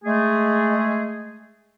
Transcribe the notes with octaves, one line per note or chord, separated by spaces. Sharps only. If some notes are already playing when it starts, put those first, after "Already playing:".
G#3 A3 G#4